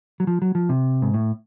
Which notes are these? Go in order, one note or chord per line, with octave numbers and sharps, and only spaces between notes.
F#3
F3
F#3
F3
C3
G#2
A2